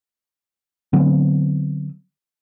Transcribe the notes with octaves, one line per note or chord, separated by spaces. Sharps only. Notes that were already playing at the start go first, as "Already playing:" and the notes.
D3 F#3 B3 C4